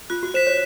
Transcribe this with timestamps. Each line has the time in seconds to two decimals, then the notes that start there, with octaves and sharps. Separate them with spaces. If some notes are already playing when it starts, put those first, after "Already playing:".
0.10 F4 F#6
0.23 F#4
0.34 C5 B6 E7
0.47 C#5